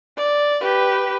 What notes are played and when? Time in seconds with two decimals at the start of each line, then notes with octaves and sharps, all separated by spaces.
0.17 D5
0.61 G4 B4